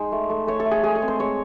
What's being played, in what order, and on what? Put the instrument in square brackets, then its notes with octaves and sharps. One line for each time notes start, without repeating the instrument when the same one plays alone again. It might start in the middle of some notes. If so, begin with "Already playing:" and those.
Already playing: [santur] G#3 D#4 C5
A3
A3
A3 C#5
A4
A3
G#4
G#3 G#4
A4
C4
C5
G#3 C#5